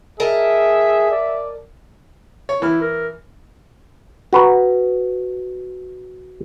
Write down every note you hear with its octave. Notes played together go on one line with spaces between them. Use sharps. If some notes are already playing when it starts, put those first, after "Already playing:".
G#4 A#4 D#5 E5 A5
D5
C#5
E3 E4 F6
A#4
F#4 B4 A#5